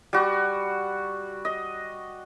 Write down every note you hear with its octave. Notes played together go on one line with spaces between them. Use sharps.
G3 F#4
D#5